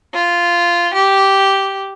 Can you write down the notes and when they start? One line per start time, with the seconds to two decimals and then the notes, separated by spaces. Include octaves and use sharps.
0.13 F4
0.93 G4